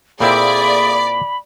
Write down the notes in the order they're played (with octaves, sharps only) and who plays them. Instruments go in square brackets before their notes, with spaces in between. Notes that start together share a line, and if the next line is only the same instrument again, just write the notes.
[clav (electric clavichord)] A#2 C4 E4 [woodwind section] A3 A#3 G#4 [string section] D5 [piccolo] B5